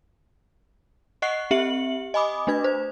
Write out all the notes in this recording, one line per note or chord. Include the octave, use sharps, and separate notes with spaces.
D#5 F#5 C#6 F#6 C7
C4 G4 E5 C#7 F#7
D#5 G#5 B5 D6 D#6
A3 D4 B4 G#6
C5